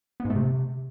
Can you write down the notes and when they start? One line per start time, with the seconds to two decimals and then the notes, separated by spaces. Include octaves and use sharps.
0.20 B3
0.25 G#2
0.30 A3
0.35 C3